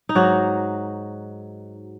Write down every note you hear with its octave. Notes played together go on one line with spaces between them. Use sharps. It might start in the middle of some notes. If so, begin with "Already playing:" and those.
D#4
G#2 F#3 F#4